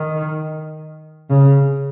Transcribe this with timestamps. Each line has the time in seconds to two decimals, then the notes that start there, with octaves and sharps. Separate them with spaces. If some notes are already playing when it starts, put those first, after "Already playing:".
Already playing: D#3
1.30 C#3